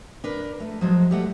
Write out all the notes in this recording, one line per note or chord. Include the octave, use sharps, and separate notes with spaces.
D4 A#4 B4
A3
F3 F#3 G#3
G3 A3 F#5